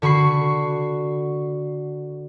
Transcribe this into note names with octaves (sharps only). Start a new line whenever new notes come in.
D3 F#4 B5 C#6 C7